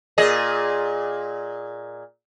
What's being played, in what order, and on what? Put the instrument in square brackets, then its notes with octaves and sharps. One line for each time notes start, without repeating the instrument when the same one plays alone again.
[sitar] A#2 G#4 D#5